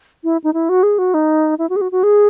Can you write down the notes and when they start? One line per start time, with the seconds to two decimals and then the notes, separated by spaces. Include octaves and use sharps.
0.24 E4
0.44 D#4
0.53 E4
0.69 F#4
0.83 G#4
0.98 F#4
1.14 D#4
1.59 E4
1.69 F#4
1.76 G#4
1.81 F#4
1.92 F#4
2.03 G#4